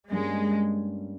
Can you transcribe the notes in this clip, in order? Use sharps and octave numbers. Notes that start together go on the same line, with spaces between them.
G2 G3 G#3 A#3 C#4